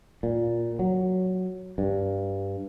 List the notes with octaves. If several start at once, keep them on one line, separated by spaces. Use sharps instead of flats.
A#2
F#3
G2